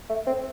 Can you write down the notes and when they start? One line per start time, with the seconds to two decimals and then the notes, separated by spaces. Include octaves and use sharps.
0.09 A3
0.27 C4